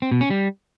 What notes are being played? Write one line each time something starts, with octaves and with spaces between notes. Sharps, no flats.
C4
B2
C#4
G3